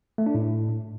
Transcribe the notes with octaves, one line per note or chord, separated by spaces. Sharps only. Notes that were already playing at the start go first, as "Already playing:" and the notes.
A3
D4
A2